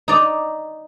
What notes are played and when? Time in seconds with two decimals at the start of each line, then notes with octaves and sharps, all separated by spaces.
0.08 D#4 D5